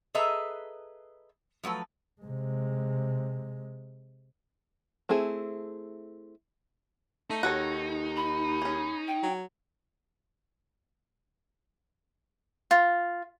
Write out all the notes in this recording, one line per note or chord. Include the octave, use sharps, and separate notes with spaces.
G#4 A4 B4 D#5 E5 A#5
F3 F#3 A3 B4
C3 G#3
A3 C4 E4 G#4
A3 D#4
D#2 F#4 A4 C#5
B5
C#4 G#4
G5
F#3
F4